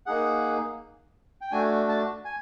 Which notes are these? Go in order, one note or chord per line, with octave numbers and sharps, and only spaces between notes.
A#3 D#4 G#4 F#5
G5
A3 D4 F#4 G#5
A5
G#5